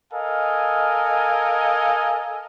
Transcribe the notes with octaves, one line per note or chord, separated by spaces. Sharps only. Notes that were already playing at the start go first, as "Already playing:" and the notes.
A4 A#4 D#5 F5 G#5